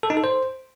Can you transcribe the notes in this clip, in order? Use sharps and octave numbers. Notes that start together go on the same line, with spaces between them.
A4
D#4
A4
C5